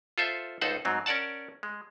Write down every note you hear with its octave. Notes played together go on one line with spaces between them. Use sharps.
F4 A4 C5 E5
C#2 D#4 A4 C5 F#5
G#2 F#3 C4
C#4 A#4 D5 F#5 A5
G#3